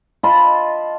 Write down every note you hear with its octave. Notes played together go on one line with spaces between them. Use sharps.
F4 D#5 A5 B5